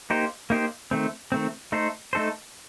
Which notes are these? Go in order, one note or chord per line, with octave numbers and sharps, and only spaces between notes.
A#3 D#4 G4 C5
A#3 D#4 G4 C5
D#3 A3 C4
D#3 A3 C4
A3 D#4 A4 C5
A3 D#4 A4 C5